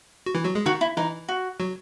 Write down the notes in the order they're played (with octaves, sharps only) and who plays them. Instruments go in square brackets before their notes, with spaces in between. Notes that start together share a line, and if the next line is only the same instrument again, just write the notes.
[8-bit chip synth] F#4
E3 E4
F#3 F#4
G#3 G#4
[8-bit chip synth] D#3 D#4 [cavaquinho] F#4
[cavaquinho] E4
[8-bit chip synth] E3 E4 [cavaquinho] D#4
[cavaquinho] F#4
[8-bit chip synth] F#3 F#4